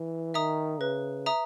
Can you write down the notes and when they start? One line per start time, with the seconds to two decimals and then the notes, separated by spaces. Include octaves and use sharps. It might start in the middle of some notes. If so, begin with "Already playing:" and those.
Already playing: E3
0.34 D#3 E5 A#5 D#6
0.80 C#3 B4
1.26 E5 A#5 D#6